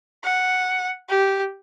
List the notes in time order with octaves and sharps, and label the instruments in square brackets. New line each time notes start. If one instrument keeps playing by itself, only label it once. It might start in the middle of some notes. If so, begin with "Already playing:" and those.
[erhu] F#5
G4